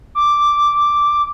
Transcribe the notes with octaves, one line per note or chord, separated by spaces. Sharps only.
D6